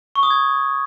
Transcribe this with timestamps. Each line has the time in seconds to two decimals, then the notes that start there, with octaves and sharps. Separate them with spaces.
0.15 C#6
0.23 D#6
0.30 G#6